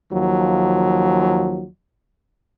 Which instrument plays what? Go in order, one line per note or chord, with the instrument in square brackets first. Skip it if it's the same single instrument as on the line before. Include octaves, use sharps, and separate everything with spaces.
[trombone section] D#2 F3 F#3